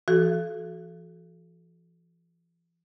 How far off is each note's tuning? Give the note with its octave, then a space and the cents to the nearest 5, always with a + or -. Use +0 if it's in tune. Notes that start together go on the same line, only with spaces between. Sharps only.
E3 +45 F#4 +0 A4 -25